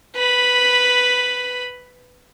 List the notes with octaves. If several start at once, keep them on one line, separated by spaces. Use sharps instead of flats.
B4 B5